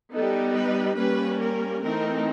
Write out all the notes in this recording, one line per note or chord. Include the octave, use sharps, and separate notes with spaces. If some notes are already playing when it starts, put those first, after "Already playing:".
G3 B3 D#4 A4
B4
G3 A#3 C#4 B4
A#4
E3 A3 C4 D#4 A#4